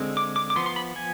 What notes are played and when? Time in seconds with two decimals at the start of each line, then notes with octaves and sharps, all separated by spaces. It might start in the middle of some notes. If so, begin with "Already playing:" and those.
Already playing: D3 G#3 C4
0.17 D6
0.36 D6
0.50 D6
0.56 F3 B3 C6
0.66 C6
0.76 B5
0.96 G#5